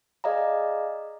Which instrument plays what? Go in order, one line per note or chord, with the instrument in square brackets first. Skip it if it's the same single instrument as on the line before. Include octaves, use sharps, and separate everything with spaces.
[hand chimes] G#4 D5 D#5 F5 A#5